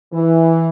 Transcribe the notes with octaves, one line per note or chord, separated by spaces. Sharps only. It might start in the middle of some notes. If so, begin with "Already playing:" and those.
E3